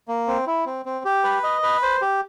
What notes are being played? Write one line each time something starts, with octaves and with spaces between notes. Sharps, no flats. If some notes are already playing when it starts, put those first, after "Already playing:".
A#3
C4
E4
C4
C4
G4
B4
D#5
B4
C5
G4